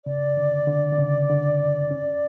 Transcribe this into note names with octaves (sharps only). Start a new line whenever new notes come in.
C#3 D5
D3
D3
D3
C#3
D3
C#4